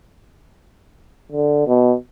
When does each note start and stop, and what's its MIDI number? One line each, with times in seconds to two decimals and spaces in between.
1.32 1.65 50
1.67 1.95 47